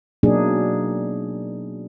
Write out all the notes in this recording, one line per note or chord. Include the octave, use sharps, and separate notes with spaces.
B2 F#3 A#3 D4 D#4 G#4